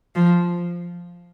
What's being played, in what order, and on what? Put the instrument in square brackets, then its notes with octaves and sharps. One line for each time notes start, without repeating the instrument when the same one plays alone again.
[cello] F3